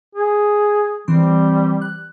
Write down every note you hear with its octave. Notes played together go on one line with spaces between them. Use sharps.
G#4
E3 G3 C4 C6
F#6